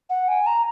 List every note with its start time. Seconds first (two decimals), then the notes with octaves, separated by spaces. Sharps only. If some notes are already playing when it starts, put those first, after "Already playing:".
0.10 F#5
0.28 G#5
0.47 A#5